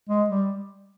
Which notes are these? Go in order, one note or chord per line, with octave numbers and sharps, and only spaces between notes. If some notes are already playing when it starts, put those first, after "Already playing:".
G#3
G3